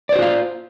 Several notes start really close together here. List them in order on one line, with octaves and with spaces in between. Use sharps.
D5 C5 F#4 F4 F5